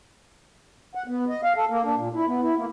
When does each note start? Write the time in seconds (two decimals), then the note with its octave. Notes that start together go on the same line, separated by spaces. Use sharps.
0.95 F#5
1.07 B3
1.29 D#5
1.43 F5
1.56 A4
1.69 A#3
1.85 D4
1.96 A#2
2.14 E4
2.28 B3
2.42 E4
2.57 A#3